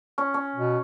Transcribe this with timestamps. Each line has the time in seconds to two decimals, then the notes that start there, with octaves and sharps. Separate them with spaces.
0.18 C#4
0.34 C#4
0.56 B2